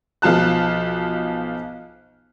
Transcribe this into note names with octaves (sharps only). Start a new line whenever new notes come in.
B1 F3 F4 A5 F#6